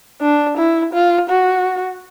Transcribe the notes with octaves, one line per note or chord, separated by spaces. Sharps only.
D4
E4
F4
F#4